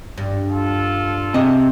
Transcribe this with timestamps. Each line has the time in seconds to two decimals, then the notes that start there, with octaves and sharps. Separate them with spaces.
0.18 G2
0.50 F4 A4
1.34 C3 G#4 D#5